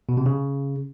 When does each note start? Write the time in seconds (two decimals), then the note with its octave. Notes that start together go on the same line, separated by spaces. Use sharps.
0.09 B2
0.17 C3
0.26 C#3